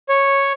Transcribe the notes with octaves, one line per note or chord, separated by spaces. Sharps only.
C#5